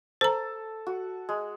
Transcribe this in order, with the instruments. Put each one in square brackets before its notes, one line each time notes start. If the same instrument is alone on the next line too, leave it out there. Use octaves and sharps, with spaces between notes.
[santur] A4 [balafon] C5 A#5
[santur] F#4
G#3